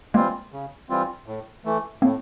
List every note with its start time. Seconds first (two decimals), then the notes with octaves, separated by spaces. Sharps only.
0.14 E3 G3 G#3 A#3 C4 F4
0.52 C#3
0.89 E3 G3 C4 F4
1.26 A2
1.65 E3 A3
2.02 A2 A#3 C4